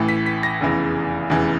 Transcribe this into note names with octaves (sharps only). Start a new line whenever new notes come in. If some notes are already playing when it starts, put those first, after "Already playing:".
Already playing: A1 A2 E3
B6
B6
A#6
F1 E2 C#3 E3
F1 E2 C#3 E3